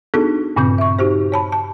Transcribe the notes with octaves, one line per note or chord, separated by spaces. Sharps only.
B3 D4 D#4 F#4 G#4 A4
G2 A#2 C#3 C4 D6 G6
E5 C#6
D#4 F#4 G4 C5
C#5 A5 B5
A5